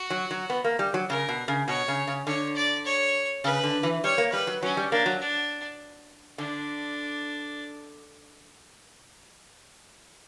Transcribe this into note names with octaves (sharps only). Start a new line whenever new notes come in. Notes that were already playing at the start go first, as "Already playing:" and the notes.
Already playing: F#4
F#3
F#3
B3
A#3
G3
F#3
C#3 A#4
B2
C#3
B2 C#5
C#3
C#3
D3 C#5
D5
C#5
C#3 B4
D3
E3
G3 C#5
A#3
G3 B4
F#3
F#3 C#4
G3
A#3 D4
F#3
D4
D3 D4